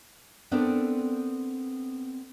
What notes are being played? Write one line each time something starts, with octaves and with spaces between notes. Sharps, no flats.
B3 C4 D4 A4 A#4